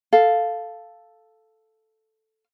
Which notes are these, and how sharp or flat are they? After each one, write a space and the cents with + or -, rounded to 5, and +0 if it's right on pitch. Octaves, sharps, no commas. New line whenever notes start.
A4 +0 F5 +0